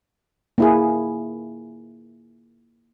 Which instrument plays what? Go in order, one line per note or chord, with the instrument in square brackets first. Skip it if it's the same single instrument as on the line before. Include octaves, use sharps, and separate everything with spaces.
[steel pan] A#3 E4 G#4